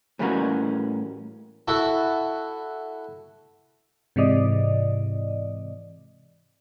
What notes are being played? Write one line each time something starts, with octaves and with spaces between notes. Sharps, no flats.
A2 E3 G3 A#3 C#4 F#4
E4 F#4 A4
G#2 C3 E3 D5 D#5